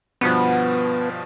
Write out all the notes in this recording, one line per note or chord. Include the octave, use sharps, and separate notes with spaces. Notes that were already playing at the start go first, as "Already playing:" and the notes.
G2 B2 F3 B3